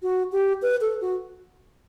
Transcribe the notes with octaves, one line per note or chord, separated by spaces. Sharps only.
F#4
G4
B4
A4
F#4